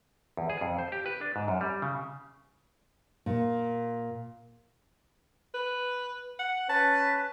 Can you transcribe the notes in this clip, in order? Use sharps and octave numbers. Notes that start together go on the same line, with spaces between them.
E2
G#4
F2
C5
G4
B4
D4
G#2
F#2
G3
C#3
A#2
B4
F#5
C#4 B4 A5